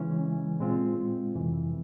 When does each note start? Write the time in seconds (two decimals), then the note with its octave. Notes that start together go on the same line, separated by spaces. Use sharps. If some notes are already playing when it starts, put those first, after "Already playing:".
Already playing: C#3 E3 G#3 C#4
0.60 A#2 G#3 C4 F4
1.35 F2 C3 E3